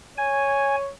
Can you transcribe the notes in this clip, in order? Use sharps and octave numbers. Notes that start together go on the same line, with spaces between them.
C#5 G#5